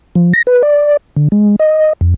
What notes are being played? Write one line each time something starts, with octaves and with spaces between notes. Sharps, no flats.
F3
A#6
B4
D5
D3
G#3
D#5
F2